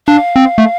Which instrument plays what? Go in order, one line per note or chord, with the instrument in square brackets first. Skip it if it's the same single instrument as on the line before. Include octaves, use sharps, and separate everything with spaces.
[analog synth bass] D4 [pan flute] F5
[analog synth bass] C4
A3